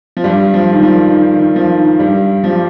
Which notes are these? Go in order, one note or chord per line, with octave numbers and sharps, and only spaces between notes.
F3
G2 G3
F3
D#3
F3
D#3
D#3
F3
D#3
G2 G3
F3
G3